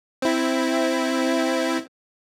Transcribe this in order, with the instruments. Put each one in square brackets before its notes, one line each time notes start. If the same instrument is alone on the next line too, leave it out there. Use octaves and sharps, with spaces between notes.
[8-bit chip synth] C4 E4